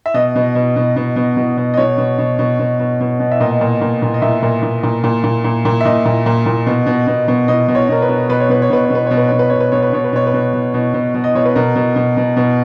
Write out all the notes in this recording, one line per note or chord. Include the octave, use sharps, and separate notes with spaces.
E5
B2 D#5
B2
B2
B2
B2
B2
B2
B2
D#5
B2 C#5
B2
B2
B2
B2
B2
B2
B2
E5
A#2 D#5
A#2
A#2
A#2
D#5
A#2 E5
A#2
A#2
A#2
A#2
A#2
A#2
A#2
E5
A#2 D#5
A#2
A#2
A#2
B2
B2
B2
B2
B2 D#5
B2
C#5
B2 A#4
B4
B2
B2 B4
C#5
B2 B4
C#5
B2 B4
C#5
B2 B4
B2 C#5
B4
B2 C#5
B4
B2 C#5
B4
B2 C#5
B4
B2 C#5
B4
B2 C#5
B4
B2
B2
B2
B2
B2
D#5
B2 C#5
B4
B2 A#4
B2
B2
B2
B2